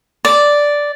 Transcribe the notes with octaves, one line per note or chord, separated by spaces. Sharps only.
D5